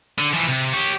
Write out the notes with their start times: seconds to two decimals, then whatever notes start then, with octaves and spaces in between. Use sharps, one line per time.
0.19 D3
0.34 E3 F3
0.49 C3
0.73 G4 C#5